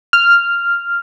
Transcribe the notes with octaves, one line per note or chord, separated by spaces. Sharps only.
F6